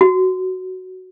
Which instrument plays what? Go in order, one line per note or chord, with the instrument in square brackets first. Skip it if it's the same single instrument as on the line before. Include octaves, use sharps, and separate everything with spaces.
[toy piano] F#4